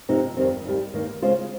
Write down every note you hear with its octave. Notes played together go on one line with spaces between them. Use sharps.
C3 F3 C4 D#4
F2 D#3 G3 C4
D#2 D#3 G3
D#2 D#3 A#3
C#3 G#3 C#4 F4 C5